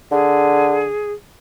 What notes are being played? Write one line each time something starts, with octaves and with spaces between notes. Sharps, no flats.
D3 G#4